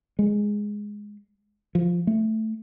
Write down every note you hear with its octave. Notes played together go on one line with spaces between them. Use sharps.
G#3
F3
A3